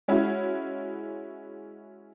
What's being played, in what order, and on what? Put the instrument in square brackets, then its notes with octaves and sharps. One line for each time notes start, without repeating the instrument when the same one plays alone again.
[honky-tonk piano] G#3 C#4 E4 F#4